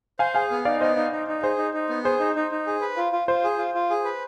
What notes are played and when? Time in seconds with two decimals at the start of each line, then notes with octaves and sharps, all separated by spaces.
0.19 C5 F5 G#5
0.35 G#4 F5 G#5
0.51 B3
0.65 D#4 D5 F5
0.81 B3 C5 D#5
0.97 D#4
1.12 D#4
1.27 D#4
1.42 G#4 C5
1.58 D#4
1.74 D#4
1.90 B3
2.04 G#4 C5
2.19 D#4
2.35 D#4
2.51 D#4
2.67 G#4
2.81 B4
2.97 F4
3.12 F4
3.28 F4 C5
3.44 G#4
3.58 F4
3.74 F4
3.90 G#4
4.05 B4